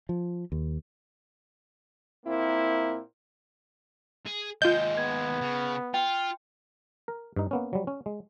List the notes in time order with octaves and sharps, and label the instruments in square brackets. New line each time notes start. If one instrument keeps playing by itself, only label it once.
[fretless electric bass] F3
D#2
[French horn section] A#2 A#3 C4 E4
[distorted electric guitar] G#4
[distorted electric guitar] D#2 G#3 [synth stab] F4 G6 [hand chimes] D#5
[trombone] B3 [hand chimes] G#6
[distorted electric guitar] C#3
[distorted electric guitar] F4 [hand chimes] G5
[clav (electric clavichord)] A#4
G2 D#4
A#3 B3 C#4
F#3 G3
C#4
G#3